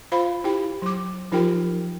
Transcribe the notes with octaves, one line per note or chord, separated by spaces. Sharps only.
F4 C5 F5 B5
E4 G4 G5
F#3 D6
F3 D#4 F4 G4 A#4 G5